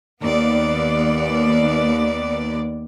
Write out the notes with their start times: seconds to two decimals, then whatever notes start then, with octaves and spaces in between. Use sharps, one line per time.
0.20 D#2 B3 D5